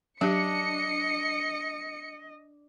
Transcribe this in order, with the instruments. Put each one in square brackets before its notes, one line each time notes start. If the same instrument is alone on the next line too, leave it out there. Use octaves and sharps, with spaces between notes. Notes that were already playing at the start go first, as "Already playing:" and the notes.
[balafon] F#3 G4 [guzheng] D4 [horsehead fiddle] D#5 [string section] C#7